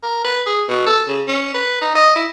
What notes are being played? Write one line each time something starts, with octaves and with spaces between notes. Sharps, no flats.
A#4
B4
G#4
B2
A4
C#3
C#4
B4
D#4
D#5
E4